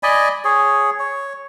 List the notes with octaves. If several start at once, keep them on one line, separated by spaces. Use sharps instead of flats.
D5 D#5 G#5 B5
G#4 C#5
C#5